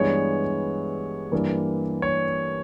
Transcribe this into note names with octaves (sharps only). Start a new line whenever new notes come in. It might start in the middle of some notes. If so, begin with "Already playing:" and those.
Already playing: G2 E3 G#3 B3 C#5
G2 E3 A#3
C#5